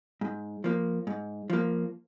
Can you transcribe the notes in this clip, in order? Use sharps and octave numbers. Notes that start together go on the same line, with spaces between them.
G#2
F3 A#3
G#2
F3 A#3